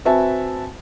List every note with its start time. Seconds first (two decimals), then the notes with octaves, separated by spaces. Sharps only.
0.05 C4 F#4 B4 E5 G#5 A5